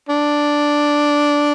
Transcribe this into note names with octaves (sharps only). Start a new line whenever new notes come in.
D4